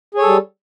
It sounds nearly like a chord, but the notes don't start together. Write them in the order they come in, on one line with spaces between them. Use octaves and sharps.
G#4 C#5 A4 G3